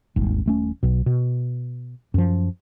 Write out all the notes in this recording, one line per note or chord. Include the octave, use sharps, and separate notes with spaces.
D#1 G#1
D#1 A3 C#4
B1 B2
B2
F#2 F3